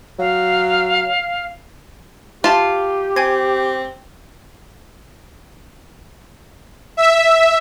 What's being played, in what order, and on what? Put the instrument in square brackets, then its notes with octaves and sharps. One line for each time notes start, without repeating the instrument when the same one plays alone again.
[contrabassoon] F#3 [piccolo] F5
[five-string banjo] F4 [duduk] G4 [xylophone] E5 A5
[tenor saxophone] C4 [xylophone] G5 G#5 G#6
[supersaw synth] E5